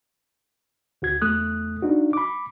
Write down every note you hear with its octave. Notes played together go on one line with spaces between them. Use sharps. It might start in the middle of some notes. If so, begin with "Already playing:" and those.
D2 F#4 G#6
E2 A3 D#6 F#6
D4 D#4 F#4
B5 D6